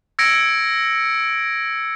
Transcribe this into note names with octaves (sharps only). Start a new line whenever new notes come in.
E6 G#6 A#6 C#7 D7